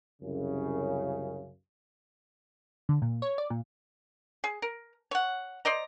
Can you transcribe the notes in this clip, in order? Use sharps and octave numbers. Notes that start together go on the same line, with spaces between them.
C2 F#2 C#3
D3
A#2
C#5
D5
A#2
G#4
A#4
C#5 F#5
C5 D5 D#5 A#5